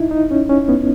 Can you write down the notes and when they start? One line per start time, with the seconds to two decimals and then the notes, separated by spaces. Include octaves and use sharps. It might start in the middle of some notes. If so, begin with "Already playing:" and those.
Already playing: D#4 E4
0.11 D#4
0.31 C#4
0.49 C#4
0.69 B3